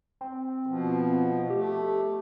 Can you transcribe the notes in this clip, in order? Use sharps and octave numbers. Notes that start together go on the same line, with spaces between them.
C4
B2 F3
A3 G4